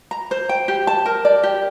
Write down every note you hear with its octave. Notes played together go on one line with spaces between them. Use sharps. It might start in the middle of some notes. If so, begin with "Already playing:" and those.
A#5
C5
G5
G4
A5
A#4
D5
G4